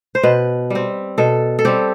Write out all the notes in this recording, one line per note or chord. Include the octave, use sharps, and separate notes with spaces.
C5
B2 B4
G3 C4
B2 A4
A4
G3 C4 G4